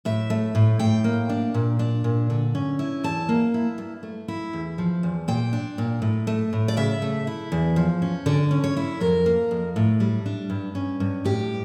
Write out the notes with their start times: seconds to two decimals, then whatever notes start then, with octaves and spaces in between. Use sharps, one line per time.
0.05 A2 E5
0.30 A3
0.55 A2
0.79 A2 G5
1.04 A#3
1.29 D4
1.54 A#2
1.79 D4
2.04 A#2
2.30 D3
2.55 C#4
2.79 E4
3.04 E2 A5
3.29 A#3
3.54 E4
3.78 G2
4.03 A3
4.28 E4
4.53 E2
4.78 F3
5.03 E2
5.28 A#2 G5
5.53 D4
5.78 A#2
6.02 A2
6.27 A3
6.53 A2
6.68 D5
6.77 C#3 E5
7.02 A3
7.27 E4
7.52 E2
7.76 F3
8.02 C#4
8.26 D3 D5
8.51 C#4
8.64 C#5
8.77 E4
9.00 F2 A#4
9.26 A#3
9.51 F2
9.76 A2
10.00 G3
10.26 D4
10.50 G2
10.75 C#4
11.00 G2
11.24 A2 G4